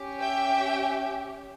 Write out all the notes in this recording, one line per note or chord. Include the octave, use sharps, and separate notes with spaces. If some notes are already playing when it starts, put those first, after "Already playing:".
Already playing: C#4 G4
E5 G5